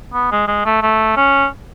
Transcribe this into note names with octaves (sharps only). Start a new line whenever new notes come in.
B3
G#3
G#3
A3
A3
C#4